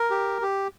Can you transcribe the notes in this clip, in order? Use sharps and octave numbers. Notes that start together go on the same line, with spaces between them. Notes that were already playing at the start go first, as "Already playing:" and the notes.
Already playing: A#4
G4
G4